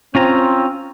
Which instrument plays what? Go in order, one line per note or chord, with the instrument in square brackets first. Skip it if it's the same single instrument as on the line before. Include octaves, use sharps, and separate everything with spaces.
[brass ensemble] C4 [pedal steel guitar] C#4 F4 A#5